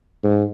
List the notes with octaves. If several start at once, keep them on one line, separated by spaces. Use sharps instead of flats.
G#2